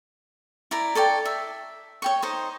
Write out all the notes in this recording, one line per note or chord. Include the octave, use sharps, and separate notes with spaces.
E4 D5 A#5
A4 C#5 D5 G5
E5
C#5 G5 C#6
D#4 C5 D#5